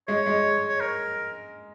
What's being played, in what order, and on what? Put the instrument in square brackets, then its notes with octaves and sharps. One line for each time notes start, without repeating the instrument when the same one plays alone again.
[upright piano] G#3 [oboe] C#5
[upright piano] G#3
[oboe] C#5
A#4